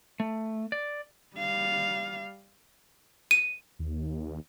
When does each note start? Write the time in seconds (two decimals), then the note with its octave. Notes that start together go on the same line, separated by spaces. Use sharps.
0.20 A3
0.72 D5
1.37 G3 F5
3.31 D#7
3.79 D#2